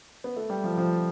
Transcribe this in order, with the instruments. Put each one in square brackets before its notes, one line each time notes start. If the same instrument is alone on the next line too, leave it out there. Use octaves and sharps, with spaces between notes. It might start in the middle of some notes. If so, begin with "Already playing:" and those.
[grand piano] B3
A3
G3
F3
F3